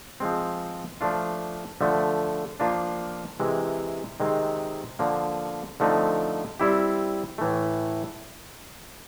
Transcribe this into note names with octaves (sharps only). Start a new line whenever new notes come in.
F3 G#3 C4
F3 A3 D4 F4
D3 F3 A3
F3 A#3 D4 F4
C3 E3 G#3
C3 D#3 G#3 C4
D3 F3 A#3
D3 F3 A3 C4 D#4
G3 C4 E4 G4
A2 E3 A3